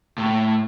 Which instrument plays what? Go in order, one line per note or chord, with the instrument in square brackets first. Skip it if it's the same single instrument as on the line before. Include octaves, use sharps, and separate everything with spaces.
[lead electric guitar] A2